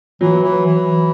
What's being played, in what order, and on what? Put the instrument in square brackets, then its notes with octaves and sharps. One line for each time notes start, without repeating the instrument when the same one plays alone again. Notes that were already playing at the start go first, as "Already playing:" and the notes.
[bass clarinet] E3 [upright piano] F#3
[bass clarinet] E3
E3